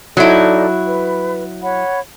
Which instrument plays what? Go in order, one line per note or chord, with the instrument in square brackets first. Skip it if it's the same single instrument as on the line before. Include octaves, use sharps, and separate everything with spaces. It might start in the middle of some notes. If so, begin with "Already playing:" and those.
[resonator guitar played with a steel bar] F#3 E4 [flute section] D#4 A4 D5
[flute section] B4
C#5 F#5 B5